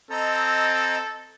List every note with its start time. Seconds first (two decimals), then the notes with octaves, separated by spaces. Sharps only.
0.11 C4 A4 D#5 A#5